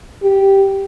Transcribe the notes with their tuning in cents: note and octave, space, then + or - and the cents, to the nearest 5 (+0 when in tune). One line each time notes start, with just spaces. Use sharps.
G4 -5